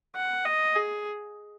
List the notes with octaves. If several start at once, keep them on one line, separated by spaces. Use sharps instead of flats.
F#5
D#5
G#4